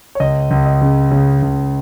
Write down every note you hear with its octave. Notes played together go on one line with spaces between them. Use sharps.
C#5
C#2 D#5
C#2
D#5
C#3
C#3
C#2